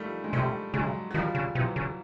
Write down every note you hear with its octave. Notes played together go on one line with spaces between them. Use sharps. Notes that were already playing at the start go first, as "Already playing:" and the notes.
Already playing: D#3 F3 G3 A3
G#3
C3 G3 A3
C#3 F#3 G#3
F#3
D#3 F3 G3
C#3
C3 E3 F#3
C#3